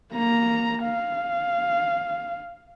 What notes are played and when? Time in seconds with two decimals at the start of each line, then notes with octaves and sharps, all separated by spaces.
0.13 A#3 A#5
0.84 F5